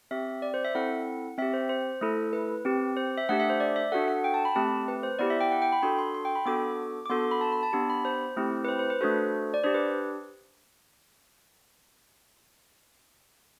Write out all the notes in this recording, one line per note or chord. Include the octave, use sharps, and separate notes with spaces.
C4 G4 E5
D5
C5
E5
C4 E4 A4 F#5
C4 G4 E5
C5
C5
A3 E4 A4
B4
C4 G4
C5
E5
A3 D4 G4 F#5
E5
C5
D5
E5
D4 F#4 A4 F#5
F#5
G5
A5
B5
A3 C4 G4 A5
B4
C5
B3 E4 G4 D5
E5
G5
F#5
G5
B5
D4 F#4 A4 C6
C6
C6
G5
B5
B3 D4 F#4 A4 D6
D6
B3 D4 F#4 A4 C6
C6
B5
A5
B5
A5
B3 D4 G4 A5
B5
C5
A3 C4 E4 G4
B4
C5
C5
B4
A3 D4 F#4 A4 C5
D5
D4 G4 C5
B4